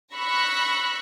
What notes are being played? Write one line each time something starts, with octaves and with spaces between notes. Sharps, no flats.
B5 C#6 E6 F#6 A#6